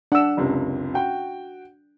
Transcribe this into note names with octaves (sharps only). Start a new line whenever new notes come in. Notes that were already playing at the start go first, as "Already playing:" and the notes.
D4 F#5 E6
F#1 C#2 C3
F#4 G5